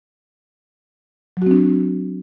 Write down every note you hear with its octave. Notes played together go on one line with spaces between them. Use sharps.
F#3 C4 D4 F#4